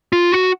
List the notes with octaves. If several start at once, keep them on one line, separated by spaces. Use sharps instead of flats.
F4
F#4